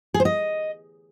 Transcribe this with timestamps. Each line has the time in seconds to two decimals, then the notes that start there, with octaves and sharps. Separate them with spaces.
0.14 G#4
0.20 C5
0.25 D#5